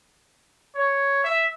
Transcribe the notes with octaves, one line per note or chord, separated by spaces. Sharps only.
C#5
E5